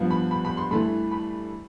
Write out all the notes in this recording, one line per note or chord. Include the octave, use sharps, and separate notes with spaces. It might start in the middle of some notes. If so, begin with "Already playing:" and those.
Already playing: G2 F3 B3
B5
B5
B5
C6
G2 E3 A3 B5
B5